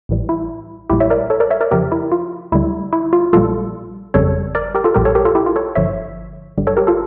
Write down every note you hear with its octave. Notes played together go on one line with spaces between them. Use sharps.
A1 A2 E3 G3
E4
A#1 A#2 G3 E4 G4
C#5 E5
A#4 D5
A4 C#5
A#4 D5
C#5 E5
A#4 D5
F2 C#3 F3 G4 A#4
E4
F4
D2 D3 G3 E4
E4
F4
A#1 A#2 G3 F4 A4
G1 F2 C#3 G3 A4 C#5
A#4 D5
G4 A#4
F4 A4
A#1 A#2 G3 G4 A#4
A4 C#5
G4 A#4
F4 A4
E4 G4
F4
A4 C#5
G1 G2 D3 F3 C#5 E5
G1 G2 D3 G3
A4 C#5
G4 A#4
F4 A4